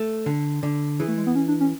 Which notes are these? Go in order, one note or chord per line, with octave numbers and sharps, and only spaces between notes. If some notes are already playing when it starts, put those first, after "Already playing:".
Already playing: A3
D3
D3
E3 G#4
A3
G#3
B3
C#4
D4
C#4